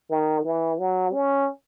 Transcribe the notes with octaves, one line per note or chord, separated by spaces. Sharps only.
D#3
E3
F#3
C#4